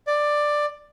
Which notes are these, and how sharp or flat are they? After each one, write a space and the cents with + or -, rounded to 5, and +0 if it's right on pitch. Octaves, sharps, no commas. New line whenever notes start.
D5 +10